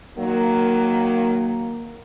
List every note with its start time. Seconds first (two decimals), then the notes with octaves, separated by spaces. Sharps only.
0.18 D#3 F#3 A#3